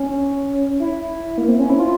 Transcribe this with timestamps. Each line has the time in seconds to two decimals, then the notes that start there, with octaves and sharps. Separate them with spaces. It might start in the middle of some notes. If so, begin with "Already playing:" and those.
Already playing: C#4
0.80 E4
1.38 A#3
1.48 C4
1.59 C#4
1.69 E4
1.79 F4